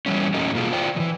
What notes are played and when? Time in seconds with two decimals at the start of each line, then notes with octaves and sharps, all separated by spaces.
0.06 E3 G3 C#4
0.34 E2 A#2 F#3 A3 C#4 D#4
0.55 B2 A#3 F4 F#4 G#4
0.71 F4 C5 D5 G5
0.96 D#3 E3